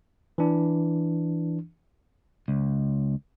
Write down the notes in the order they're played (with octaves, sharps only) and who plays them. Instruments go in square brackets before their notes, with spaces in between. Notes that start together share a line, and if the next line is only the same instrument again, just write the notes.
[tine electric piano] E3 D4
[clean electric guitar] C#2